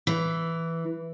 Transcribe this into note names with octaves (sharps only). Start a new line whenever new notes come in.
E3